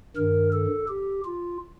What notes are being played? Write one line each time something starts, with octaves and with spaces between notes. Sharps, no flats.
G2 D#3 A#4
A4
G4
F4